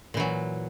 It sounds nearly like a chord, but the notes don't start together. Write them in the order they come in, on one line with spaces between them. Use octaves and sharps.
A#2 E3 F#3